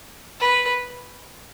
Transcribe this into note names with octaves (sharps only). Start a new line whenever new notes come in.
B4